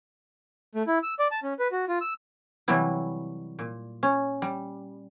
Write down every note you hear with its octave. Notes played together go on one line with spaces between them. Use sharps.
A3
E4
E6
D5
A5
C#4
B4
F#4
F4
E6
C3 E3 F#3 G3 E4
A#2
C#4
G3